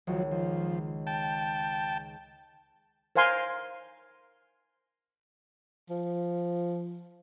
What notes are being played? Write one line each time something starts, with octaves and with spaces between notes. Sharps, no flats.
C#2 D#3 F3 F#3
F3
G5 A5
A#4 C5 F5 G#5 C6
F3